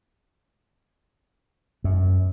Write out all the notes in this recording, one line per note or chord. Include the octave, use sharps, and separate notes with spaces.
F#2